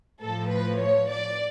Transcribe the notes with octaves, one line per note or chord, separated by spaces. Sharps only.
A2 F3 A4
B4
C#5
D5